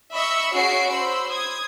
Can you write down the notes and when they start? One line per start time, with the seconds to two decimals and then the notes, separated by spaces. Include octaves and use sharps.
0.12 D#5 E5 B5 C#6 E6
0.55 C#4 F#4 G#4 C#5 C7 D7
0.88 C5 B5 E6
1.30 D#6 G#6